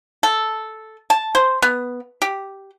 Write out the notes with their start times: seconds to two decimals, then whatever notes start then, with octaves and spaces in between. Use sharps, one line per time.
0.23 A4
1.10 A5
1.35 C5
1.62 B3
2.22 G4